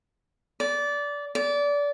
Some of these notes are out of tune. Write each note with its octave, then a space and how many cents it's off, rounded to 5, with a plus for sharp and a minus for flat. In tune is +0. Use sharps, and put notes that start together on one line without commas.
D5 -20
D5 -25